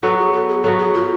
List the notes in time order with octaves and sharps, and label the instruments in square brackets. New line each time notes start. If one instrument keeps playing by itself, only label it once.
[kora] F#3 B3 F#4 [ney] A4
[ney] G#4
A4
G#4
[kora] F#3 B3 F#4 [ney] A4
[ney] G#4
F4